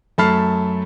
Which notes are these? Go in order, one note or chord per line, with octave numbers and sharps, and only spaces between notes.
F#2 A3 A5 B5 F6 C7